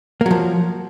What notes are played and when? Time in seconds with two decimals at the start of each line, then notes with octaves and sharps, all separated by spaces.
0.21 A#3
0.26 F#3
0.31 F3